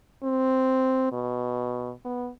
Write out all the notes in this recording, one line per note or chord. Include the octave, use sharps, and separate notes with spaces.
C4
B2
B3